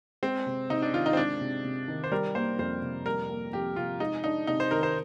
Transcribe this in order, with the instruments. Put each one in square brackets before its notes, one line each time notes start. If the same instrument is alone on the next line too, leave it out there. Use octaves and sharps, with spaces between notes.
[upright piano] G#3 [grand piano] C4
[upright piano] C3
[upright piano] C3 [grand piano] D#4
[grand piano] D4
[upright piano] D#3 [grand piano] F4
[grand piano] D#4
C4
[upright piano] G#3 [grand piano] D4
[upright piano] C3
C3
D#3
[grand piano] C5
[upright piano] G3 [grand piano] A#4
[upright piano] A#3 [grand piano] C5
[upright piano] F2 [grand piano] C5
[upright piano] C3
[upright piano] G3 [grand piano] A#4
[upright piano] A#3
[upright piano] F2 [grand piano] G4
[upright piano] C3 [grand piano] F4
[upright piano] G#3 [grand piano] D#4
[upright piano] D4 [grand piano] D#4
[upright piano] C3 [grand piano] D#4
[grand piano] C5
[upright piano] D#3 [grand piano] A#4
[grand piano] C5